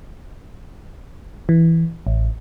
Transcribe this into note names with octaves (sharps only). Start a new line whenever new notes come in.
E3
A1